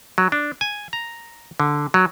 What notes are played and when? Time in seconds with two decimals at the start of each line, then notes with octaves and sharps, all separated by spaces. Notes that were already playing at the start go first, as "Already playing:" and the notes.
0.18 F#3
0.32 D4
0.61 G#5
0.93 A#5
1.60 D3
1.94 F#3